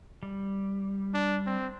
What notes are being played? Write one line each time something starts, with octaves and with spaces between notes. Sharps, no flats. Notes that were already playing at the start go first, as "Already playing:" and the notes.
G3
D4
C4